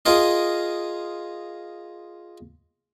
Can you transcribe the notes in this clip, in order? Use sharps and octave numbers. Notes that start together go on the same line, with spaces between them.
F4 G#4 A#4 D#5